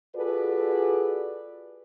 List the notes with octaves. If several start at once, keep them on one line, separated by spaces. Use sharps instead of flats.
F4 F#4 G#4 A4 B4 D5